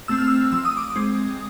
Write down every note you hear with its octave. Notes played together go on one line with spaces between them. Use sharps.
A3 C4 E6
F6
E6
F3 E6
D#6
D6
D#6
G#3 C4